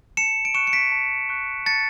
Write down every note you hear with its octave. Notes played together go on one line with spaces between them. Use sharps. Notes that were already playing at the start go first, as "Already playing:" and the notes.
A5 C#7 E7
D7
C#6 F#6 C#7 E7
C#7
B6 D7
A5
C#6 F#6
A5 A6 C#7